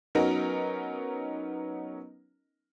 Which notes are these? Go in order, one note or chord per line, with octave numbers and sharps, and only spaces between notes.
F#3 B3 C#4 D#4 A#4 D#5